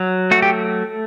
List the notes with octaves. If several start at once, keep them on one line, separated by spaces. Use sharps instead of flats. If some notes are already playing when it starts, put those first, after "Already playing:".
Already playing: F#3
A3 F#4
G4